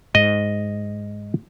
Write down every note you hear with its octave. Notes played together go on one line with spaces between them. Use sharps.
G#2 D#5